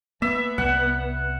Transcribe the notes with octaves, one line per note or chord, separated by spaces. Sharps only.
A#3 B3 E5
C2 G3 F#5